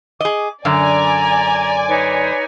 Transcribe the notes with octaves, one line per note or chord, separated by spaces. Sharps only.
G#4 D#5 D6
F#2 D3 D5 G#5 A#5
D#4 B4 C#5